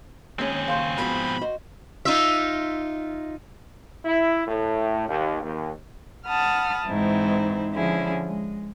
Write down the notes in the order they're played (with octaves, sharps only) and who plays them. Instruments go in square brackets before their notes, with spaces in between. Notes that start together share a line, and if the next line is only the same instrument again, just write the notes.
[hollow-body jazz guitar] D#2 G#3 C#4 [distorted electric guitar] C4 G#4
[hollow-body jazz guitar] D#2 C#3 C#5 [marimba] F5 C6 G6
[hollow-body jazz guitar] G#2 B2 F3 [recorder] B5
[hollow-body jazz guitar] F#4 C5 [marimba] D#5
[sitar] D#4 F4 E5
[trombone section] E4
A2
D#2
D#2
[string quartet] F#5 A5 B5 D#6 F6
G#2 E3 C4 D#4 E4
D3 F3 C#4 E4 G#4
G#3